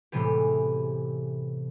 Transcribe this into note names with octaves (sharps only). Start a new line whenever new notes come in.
A2 C3 E3 G#3 B3 G4